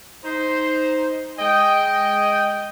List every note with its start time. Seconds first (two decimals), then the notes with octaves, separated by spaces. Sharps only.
0.24 D#4 C5
1.39 G#3 D#5 G5